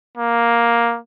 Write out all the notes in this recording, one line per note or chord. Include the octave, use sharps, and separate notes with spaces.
A#3